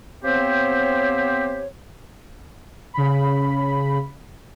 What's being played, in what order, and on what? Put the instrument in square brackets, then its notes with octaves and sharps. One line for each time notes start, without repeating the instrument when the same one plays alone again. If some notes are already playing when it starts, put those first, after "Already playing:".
[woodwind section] F3 B3 C4 G4 C5 C#5
[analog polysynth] C#3 B5